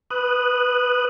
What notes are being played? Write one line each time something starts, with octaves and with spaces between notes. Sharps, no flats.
B4 D#6 F#6